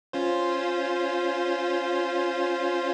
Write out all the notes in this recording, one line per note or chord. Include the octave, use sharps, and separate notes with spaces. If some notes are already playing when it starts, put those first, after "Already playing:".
C#4 F4 C5